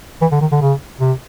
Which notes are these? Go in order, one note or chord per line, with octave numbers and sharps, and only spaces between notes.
E3
D3
D#3
D3
C#3
C3